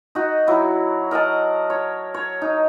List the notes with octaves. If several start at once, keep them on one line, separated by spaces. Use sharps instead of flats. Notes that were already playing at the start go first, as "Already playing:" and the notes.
D#4 F#4
F#3 E4
A#4 D#5 F#5 A5
C#5
C#5
D#4